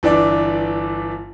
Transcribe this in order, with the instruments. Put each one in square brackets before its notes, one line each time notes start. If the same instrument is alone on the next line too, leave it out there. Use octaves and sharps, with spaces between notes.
[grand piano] G1 E3 D4 D5